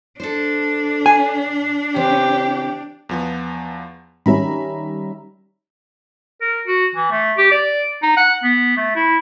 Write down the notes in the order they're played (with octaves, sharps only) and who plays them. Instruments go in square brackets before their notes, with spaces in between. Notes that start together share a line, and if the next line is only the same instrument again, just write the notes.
[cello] D4 [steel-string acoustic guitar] A4 C5
[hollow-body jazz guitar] G#5
[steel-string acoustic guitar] C#3 E3 C4 [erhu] G4
[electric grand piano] E2 F3 B3
[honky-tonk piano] D#3 G3 C#4 [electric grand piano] E5 A#5 B5
[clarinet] A#4
F#4
E3
A3
G4
D5
D#4
F#5
B3
A3
E4